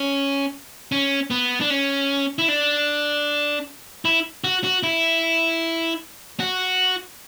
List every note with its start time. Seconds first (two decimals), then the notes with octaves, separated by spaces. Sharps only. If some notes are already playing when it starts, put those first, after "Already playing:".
Already playing: C#4
0.92 C#4
1.30 B3
1.61 D4
1.70 C#4
2.38 E4
2.48 D4
4.05 E4
4.44 F#4
4.64 F#4
4.83 E4
6.40 F#4